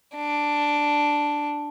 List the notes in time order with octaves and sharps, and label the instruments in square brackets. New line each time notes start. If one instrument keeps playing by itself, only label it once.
[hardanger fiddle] D4